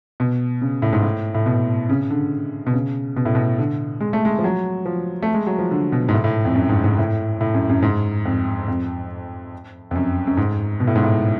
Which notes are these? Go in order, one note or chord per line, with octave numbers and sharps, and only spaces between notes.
B2
C#3
A2
G#2
A2
A2
B2
C#3
D3
B2
C#3
B2
A2
B2
D3
G#3
A3
G#3
F3
F#3
F3
A3
G#3
F#3
F3
D3
B2
G#2
A2
A2
F2
F#2
G#2
G#2
A2
A2
F#2
F#2
G#2
F2
F2
F2
F#2
F#2
G#2
B2
A2
G#2
A2